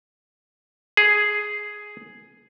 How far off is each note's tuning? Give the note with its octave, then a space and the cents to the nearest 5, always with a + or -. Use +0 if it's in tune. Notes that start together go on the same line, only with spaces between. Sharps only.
G#4 +5